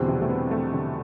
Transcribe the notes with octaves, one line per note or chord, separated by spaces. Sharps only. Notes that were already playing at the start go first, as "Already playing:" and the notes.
Already playing: E2 B2 D3 G3 C4
C3
A3
B3
A3
D3